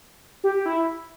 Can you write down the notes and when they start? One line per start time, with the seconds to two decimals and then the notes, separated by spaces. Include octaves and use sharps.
0.44 G4
0.55 G4
0.66 E4